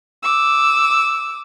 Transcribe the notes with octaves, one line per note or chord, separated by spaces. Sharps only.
D6 E6